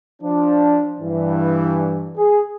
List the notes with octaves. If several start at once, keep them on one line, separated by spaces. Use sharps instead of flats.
F3 D4
G2 E3
G#4